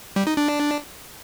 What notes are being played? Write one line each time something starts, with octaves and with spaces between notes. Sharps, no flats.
G3
D#4
D4